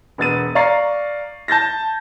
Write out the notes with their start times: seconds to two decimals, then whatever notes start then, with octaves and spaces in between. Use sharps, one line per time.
0.18 E1 B3 A6 D#7
0.55 D5 F5 A#5 C#6 A6 C7
1.48 A5 G6 A6 A#6